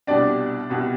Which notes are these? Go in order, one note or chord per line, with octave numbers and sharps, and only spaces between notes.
C2 B2 G3 D4 D5
C2 B2 G3